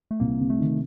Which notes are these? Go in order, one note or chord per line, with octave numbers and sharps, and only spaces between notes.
A3
C2 A#3
C3
A3
D#3